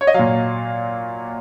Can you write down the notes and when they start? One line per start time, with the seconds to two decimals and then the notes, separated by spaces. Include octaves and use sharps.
0.01 C#5
0.07 D#5
0.14 A#2 F#3 F5